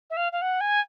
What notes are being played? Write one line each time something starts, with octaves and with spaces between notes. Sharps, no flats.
E5
F5
F5
F#5
G#5